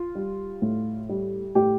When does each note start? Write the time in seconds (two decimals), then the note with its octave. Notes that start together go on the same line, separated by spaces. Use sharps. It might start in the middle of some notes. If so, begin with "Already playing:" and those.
Already playing: F4
0.15 G3
0.62 A2
1.09 G3
1.55 A2 G4